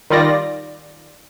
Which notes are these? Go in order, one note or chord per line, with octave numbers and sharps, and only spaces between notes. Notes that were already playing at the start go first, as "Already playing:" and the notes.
D#3 G3 F4 D5 A#6